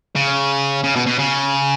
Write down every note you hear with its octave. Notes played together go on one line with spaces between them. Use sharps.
C#3
C#3
B2
B2
C#3